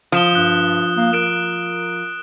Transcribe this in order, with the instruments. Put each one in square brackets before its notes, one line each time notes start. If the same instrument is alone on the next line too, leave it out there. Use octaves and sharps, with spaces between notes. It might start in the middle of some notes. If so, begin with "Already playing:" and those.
[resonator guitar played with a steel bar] F3 [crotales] D#6 E7 G7
[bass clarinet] G2 [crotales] F#6
[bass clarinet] A#3
[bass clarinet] A#4 [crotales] F#6 D7 E7